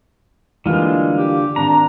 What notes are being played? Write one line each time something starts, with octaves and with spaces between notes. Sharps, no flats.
D3 E3 G3 G#3 A#3 F4
G4
G#1 D4 A#5